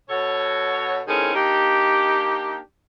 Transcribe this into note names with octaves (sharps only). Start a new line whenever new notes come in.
B2 F#4 A4 C#5
D#3 A3 C4 C#4 E4 G#4
A#3 D4 D#4 G4